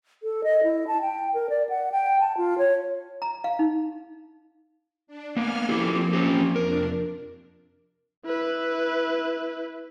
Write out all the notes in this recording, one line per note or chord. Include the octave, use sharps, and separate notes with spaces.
A4
D#5
E4
A5
G5
A#4
D5
F#5
G5
A5
F4
C#5
A#5
F5
D#4
D4
A#3 B3 G#5 F6
F3 A#3 C4 E4 G4 A4
C#4 G4
F2 C3 D4 A#4
E4 B4